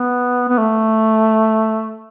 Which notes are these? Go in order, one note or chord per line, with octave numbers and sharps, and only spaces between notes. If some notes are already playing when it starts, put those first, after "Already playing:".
Already playing: B3
B3
A3